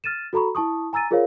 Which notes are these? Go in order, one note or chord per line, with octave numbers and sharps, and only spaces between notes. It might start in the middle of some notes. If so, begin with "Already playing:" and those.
F6 A6 D#7 E7
F#4 A4 A#5 B5 C#6
E4 A5 C#6 D#6
G#5 A#5 E6 A6 D#7
F4 G#4 A#4 C5 C#5 F5